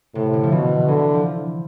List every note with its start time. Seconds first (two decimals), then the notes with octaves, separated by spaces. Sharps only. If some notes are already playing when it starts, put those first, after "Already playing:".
0.15 A2 C3
0.34 D3
0.43 F3
0.52 B2 E3
0.88 D3 E3
1.14 F3